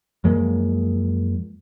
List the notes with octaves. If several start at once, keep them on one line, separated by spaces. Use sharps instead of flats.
F#2 F3 G#3 A#3